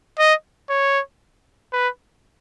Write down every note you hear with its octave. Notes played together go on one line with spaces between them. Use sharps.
D#5
C#5
B4